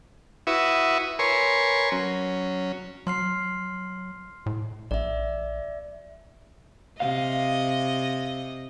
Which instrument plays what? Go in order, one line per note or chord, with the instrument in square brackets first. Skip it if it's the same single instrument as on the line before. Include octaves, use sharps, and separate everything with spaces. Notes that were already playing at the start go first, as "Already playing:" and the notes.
[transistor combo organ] E4 F#4 B4 E5 C#6 D#6
A#4 B4 C#5 G#5 C6 C#6
F#3 C#4
[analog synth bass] F#3 [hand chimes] C6 F6 C7
[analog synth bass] A2
[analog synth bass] A#1 [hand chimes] D5 E5
[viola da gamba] C3 D#5 [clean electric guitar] F5